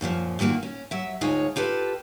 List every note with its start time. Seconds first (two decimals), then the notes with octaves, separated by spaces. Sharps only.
0.01 F#2 A#2 D3 F3
0.39 A#2 D#3 G#3 A#3 F#4
0.63 C#4
0.91 F#3 E5
1.21 D2 G#3 D#4 F4 C#5 F5
1.56 F4 G4 A4 B4